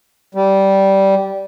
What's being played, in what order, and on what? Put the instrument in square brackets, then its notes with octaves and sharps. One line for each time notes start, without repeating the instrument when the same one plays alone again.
[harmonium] G3